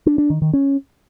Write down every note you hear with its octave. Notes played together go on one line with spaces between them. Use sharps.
D4
D4
D#3
D#3
C#4